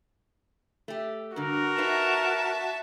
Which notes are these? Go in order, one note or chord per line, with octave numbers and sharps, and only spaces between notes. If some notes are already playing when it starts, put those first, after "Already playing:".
A3 G4
G2 D3 F#4 A#4
D#4 F4 B4 E5 A5